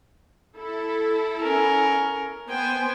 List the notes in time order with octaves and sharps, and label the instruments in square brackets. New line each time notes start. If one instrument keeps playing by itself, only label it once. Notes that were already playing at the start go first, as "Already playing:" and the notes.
[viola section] E4 A4
[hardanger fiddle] C#4 A#4
[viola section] B3 C5 G#5 [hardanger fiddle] G5